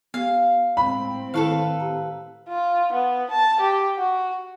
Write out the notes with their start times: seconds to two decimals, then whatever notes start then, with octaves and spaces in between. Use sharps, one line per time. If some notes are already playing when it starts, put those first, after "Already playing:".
0.14 B3 G4 F5
0.77 A2 G#3 C4 B5
1.34 D#3 E4 A4 B4 F5 A5
1.80 G4 A#5
2.48 F4
2.92 B3
3.31 A5
3.60 G4
3.98 F#4